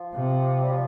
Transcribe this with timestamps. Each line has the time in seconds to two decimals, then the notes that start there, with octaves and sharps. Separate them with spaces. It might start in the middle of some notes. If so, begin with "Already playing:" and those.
Already playing: F3
0.15 C3
0.63 G3
0.71 F3